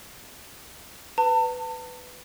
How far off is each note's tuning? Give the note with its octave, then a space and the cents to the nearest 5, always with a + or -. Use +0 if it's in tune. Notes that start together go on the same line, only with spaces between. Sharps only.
B4 +15 A5 +40